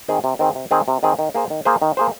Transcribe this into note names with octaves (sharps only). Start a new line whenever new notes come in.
D#3 C4 G#4
C3
D#3 C4 G#4
C3
D#3 C4 G#4
C3
D#3 C4 G#4
D#3
A#3 G#4 C5
D#3
A#3 G#4 C5
D#3
A#3 G#4 C5